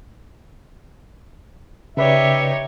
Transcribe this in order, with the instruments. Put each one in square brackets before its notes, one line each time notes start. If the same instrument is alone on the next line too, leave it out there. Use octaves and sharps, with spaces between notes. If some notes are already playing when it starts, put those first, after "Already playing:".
[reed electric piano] C#3 B4 D5 [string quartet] D#4 G4 C#5 [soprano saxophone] E5